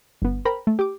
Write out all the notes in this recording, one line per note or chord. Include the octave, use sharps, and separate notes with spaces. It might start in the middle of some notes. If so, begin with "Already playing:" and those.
G1 B3
A#4 C5 G5 A#5 B5
A3
G4 D6